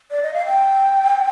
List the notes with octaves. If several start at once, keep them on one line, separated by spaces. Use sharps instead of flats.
D5
D#5
F5
G5